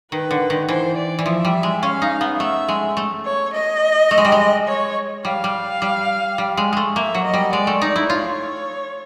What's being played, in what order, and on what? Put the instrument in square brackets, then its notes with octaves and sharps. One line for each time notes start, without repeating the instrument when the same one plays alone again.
[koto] D#3 [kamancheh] B4
[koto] D3
D#3
[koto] E3 [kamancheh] C5
[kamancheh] D5
[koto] E3
[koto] F3 [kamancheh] E5
[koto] G3
G#3
[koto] C#4 [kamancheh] F5
[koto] D#4
B3
[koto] A3 [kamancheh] E5
[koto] G#3
A3
[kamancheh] C#5
D#5
[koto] A3
G#3
G3
G#3
[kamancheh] C#5
[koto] G3 [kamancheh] F5
[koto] G3
G3
G3
G#3
G#3 A3
[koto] A#3 [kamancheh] E5
[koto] F#3
[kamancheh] D#5
[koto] G3
[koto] G#3 [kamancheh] D5
[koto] A3
[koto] D#4 [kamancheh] D5
[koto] E4
[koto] F4 [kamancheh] C#5